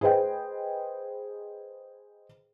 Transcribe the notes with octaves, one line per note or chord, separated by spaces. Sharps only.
G#4 B4 C5 D#5 G5